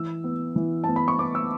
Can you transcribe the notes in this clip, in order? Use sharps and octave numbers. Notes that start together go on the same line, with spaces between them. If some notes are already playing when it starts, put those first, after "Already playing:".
Already playing: E3 E6
B3
E3
B3 A5
B5
C#6
B3 D6
E6